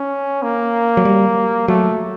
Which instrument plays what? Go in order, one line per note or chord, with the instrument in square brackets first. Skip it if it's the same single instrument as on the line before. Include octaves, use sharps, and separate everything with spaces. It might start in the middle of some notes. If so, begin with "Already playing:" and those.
Already playing: [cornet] C#4
A#3
[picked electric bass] F#3
G3
[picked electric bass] F#3 [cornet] A3